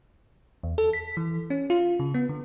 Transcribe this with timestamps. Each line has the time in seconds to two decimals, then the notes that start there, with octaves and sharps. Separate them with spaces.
0.63 E2
0.78 A4
0.93 B6
1.17 E3
1.50 C#4
1.70 F4
2.00 C#3
2.14 B3
2.29 D3